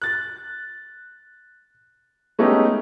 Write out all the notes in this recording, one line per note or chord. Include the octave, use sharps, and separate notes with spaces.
F#6 A6
G#3 A3 B3 C#4 D#4 G4